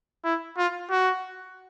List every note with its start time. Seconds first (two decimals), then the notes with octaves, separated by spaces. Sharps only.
0.24 E4
0.58 F4
0.91 F#4